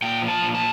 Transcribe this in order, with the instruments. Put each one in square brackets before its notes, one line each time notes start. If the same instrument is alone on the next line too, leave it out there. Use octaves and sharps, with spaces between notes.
[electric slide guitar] A#2 G5
F3
A5
A#2
A5